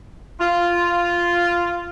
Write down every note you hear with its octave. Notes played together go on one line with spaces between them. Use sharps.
F4